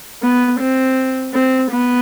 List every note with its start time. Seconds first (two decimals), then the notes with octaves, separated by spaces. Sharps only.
0.23 B3
0.60 C4
1.33 C4
1.70 B3